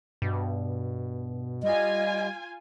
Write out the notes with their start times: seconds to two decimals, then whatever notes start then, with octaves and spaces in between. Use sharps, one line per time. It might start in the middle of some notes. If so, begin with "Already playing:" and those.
0.22 G2 B2
1.63 G3 F4 D#5 G#5